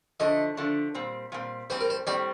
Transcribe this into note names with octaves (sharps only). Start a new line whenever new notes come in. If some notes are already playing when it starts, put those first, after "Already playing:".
D3 F3 A3 D4 D#5
D3 F3 A3 D4
A#2 G3 C4
A#2 G3 C4
A2 G3 C4 C5
A#4
C5
A2 G3 C4 D5